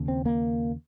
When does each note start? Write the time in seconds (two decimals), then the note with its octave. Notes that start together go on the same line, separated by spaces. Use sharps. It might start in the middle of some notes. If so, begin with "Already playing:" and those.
Already playing: D#2 C#3
0.08 C4
0.26 A#3